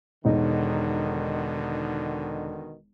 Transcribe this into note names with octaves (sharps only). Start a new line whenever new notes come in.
E1 B2 D3 D#3 D#4